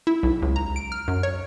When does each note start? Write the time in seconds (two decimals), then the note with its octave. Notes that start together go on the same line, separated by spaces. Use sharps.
0.07 E4
0.23 B1
0.42 C#2
0.56 A#5
0.76 D7
0.92 F6
1.08 F#2
1.23 C#5